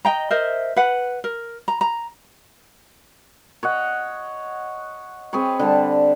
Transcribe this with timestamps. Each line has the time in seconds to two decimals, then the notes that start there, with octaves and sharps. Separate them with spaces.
0.05 D#5 G5 A#5
0.31 A#4 C5 D#5 E5
0.76 B4 F#5
1.24 A#4
1.68 A#5
1.81 A#5
3.63 C#5 D#5 F#5
5.33 C4 G#4 B4 C#5
5.59 D3 G3 A5